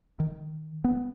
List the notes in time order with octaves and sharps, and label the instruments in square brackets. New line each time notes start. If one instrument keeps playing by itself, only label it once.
[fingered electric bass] D#3
B3